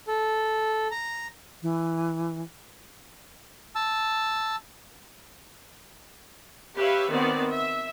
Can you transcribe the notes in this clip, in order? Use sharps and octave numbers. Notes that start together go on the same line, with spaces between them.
A4
A#5
E3
A5 E6
G4 B4 C#5 E5 F5
D#3 B3 C4 F#4 D5
E5